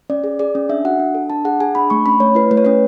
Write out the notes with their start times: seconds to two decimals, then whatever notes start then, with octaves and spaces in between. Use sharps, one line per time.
0.10 C#4 D5
0.24 G#4
0.39 G#4 D5
0.55 C#4
0.69 D4 E5
0.85 F#4 F#5
0.99 D4
1.14 A4
1.30 D4 A5
1.45 G#4 F#5
1.60 G#4 G#5
1.75 D4 B5
1.90 A3 C#6
2.06 C#4 B5
2.20 A3 C#5
2.35 E4 B4
2.51 A3 B4
2.57 C#5
2.65 C#4 B4